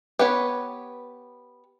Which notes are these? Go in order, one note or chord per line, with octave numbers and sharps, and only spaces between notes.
B3 G4 B4 C#5